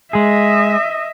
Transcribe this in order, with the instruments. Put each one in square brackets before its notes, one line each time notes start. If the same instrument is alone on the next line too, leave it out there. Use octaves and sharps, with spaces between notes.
[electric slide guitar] G#3 G#4 [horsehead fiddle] D#5 E5